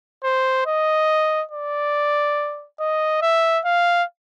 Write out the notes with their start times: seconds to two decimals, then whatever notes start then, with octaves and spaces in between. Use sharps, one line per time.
0.24 C5
0.66 D#5
1.51 D5
2.80 D#5
3.22 E5
3.65 F5